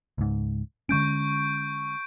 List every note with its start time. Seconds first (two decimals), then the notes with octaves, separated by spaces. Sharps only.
0.18 C#2 G#2
0.89 D3 G#3 C#4 C#6 G6 D7